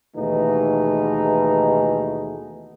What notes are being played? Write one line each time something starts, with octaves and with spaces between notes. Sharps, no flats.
D#2 B2 E3 A3 D#4 G#4